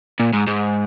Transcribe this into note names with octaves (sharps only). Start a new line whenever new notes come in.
A#2
G#2
G#2